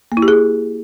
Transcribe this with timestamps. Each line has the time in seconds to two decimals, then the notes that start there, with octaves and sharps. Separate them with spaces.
0.12 A#3
0.17 E4
0.22 G4
0.28 G#4